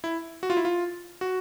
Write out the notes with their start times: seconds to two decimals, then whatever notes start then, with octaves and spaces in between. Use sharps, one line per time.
0.04 E4
0.43 F#4
0.50 F4
0.57 E4
0.65 F4
1.21 F#4